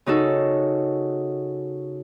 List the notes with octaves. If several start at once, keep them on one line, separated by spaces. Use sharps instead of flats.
C#3 D#4 F#4 A4